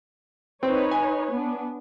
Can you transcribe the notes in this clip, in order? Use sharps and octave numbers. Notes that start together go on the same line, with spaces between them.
C4 D#4 B4 C#5
G#5
B3 D4